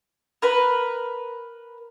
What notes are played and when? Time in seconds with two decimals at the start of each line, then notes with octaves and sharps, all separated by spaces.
0.42 A#4 B4 B5